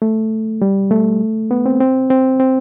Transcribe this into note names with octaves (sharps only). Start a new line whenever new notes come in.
A3
G3
A3
B3
C4
C4
C4
C4